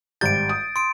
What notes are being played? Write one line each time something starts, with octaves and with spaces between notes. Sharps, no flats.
G#1 G3 G6 A6 D7
D#6
C6 D7